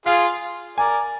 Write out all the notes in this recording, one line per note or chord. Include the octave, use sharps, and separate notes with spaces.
F4 G#4 F5
A#4 D5 G#5